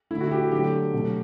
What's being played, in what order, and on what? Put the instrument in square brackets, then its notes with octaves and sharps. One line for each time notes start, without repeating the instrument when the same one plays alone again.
[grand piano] D3 A3 E4
F#4
G4
D3 F#3 A3 G4
B2 F#3 A3